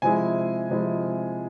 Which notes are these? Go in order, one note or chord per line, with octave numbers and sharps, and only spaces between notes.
C3 F3 G#3 E4 G#5
C3 F3 G#3 E4